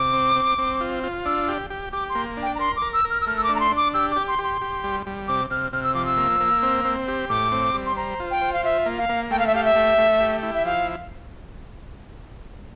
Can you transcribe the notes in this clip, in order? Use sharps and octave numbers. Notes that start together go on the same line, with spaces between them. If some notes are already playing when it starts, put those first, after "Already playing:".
Already playing: C3 D6
C4
C4
C4
F4
F4
D4 E6
G4
G4
G4 D6
C6
A#3
D4
G5
A#5
A#4 C6
D6
A#4
E6
A#4
F6
E6
A3 F6
E6
D4 D6
A#5
C6
D4
D6
G4 E6
D6
G4
C6
G4
C6
G4
G3
G3
C3 D6
C3 F6
C3 F6
E6
F3 D6
E6
A#3
A#3
C4
C4
G4
A2 D6
C4
G3
C6
C5 A#5
F4
G5
C5
F5
F4 E5
A#3
F5
A#3
A3 G5
F5
E5
G4 F5
E5
A3
A3
G4
E4
E5
F3 F5